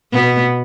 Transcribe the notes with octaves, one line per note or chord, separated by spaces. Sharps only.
B2 B3